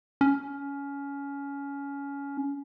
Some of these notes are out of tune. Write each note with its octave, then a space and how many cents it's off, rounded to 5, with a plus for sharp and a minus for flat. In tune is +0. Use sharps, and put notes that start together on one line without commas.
C#4 +20